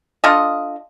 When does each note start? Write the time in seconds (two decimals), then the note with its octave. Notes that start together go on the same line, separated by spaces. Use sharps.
0.24 D4 F4 A4 D#5